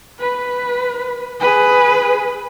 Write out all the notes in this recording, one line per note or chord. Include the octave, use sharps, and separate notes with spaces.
B4
G#4 B4